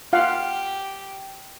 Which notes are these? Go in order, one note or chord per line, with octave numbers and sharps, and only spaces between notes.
F4 G4 F5 F#5